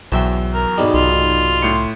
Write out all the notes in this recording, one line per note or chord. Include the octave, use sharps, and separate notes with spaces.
B1 E2 F#3 C5 E5 G5
A#4
B1 G#2 G3
C2 F4
A2 C6 C#7